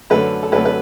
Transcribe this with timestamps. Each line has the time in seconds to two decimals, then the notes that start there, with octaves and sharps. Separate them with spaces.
0.10 F#2 D3 A3 B4
0.43 A4
0.52 F#2 D3 A3 B4
0.65 B4